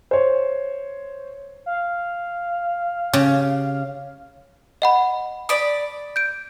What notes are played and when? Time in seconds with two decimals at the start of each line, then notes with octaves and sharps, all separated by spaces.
0.11 C5 C#5
1.66 F5
3.13 C#3 G4
4.82 D#5 F#5 B5
5.49 D5 B5 D#6
6.16 G6 D7